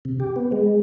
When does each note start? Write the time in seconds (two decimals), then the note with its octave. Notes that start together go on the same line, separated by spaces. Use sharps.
0.05 C3
0.20 G4
0.36 B3
0.52 G#3